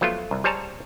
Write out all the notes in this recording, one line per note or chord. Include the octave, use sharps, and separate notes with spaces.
F3 F#3 A3 B3 F4
C2
G3 G#4 C5 C#5 A5 A#5